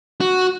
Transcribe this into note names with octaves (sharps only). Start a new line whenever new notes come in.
F#4